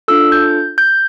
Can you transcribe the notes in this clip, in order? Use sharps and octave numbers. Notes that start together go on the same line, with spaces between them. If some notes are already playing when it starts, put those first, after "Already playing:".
D4 F4 A4 E6
G6
G6